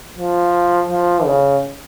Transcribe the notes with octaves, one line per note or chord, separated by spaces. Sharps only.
F3
F3
C#3